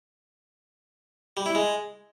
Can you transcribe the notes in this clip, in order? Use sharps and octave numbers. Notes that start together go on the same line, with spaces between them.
G3
E4
G#3